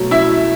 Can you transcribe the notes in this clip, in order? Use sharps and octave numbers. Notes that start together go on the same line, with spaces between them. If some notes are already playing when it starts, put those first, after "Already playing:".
Already playing: B2 F#3 A3
E4 E5